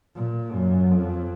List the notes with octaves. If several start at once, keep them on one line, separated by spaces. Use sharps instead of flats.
A#2
F#2
F2